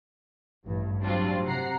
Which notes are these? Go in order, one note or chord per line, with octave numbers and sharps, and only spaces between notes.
A1 G2
F#3 G3 C4 D4 F4
C3 F#5 A#5 C7